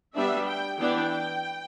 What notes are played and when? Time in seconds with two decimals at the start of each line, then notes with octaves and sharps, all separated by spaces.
0.15 G3 B3 D4 E5
0.47 G5
0.78 E3 B3 D4 G5